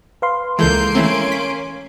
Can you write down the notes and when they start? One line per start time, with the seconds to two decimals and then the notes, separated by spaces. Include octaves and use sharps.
0.22 B4 F5 C6
0.59 C#2 E3 G#3 A#3 A4 C6 G6 D7
0.95 E3 A3 C4 C#4
1.32 B6